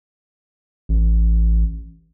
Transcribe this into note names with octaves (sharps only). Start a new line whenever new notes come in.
A1